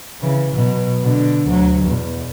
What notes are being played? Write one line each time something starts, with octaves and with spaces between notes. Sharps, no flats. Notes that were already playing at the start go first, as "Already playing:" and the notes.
C#3 E3
B2 F#3
B2 D3
D2 F#3
E2 B2